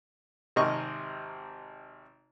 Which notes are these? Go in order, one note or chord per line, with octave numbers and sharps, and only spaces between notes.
G#1 C3 A#4 D#5 C#6